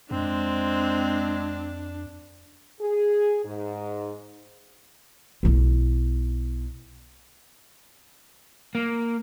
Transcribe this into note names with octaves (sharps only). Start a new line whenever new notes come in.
F2 G#3 C4 D4
G#4
G#2
B1 E4
A#3